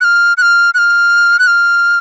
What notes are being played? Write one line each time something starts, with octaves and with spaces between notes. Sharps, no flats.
F#6
F6
F#6
F6
F#6
F6
F#6
F6